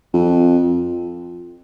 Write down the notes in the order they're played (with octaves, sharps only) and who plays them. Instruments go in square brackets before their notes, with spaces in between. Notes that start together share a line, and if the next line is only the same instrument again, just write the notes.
[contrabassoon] F2